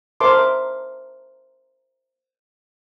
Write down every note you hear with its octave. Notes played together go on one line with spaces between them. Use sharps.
A#4 C5 E5 A5 C6 D6